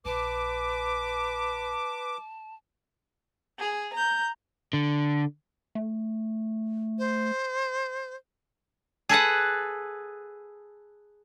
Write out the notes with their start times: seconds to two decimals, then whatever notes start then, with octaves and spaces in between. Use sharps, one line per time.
0.05 A#1 B4 A5 D6
3.59 G#4
3.93 A#5 G6
4.73 D3
5.75 A3
6.99 C5
9.09 G#4 A4 B4 F#5